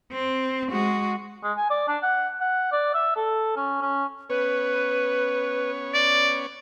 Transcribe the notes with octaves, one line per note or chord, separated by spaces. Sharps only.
C4
G#3 F#4
G#3
G#5
D5
D4
F#5
F#5
D5
E5
A4
C#4
C#4
B3 C#4 B4 C#5
D5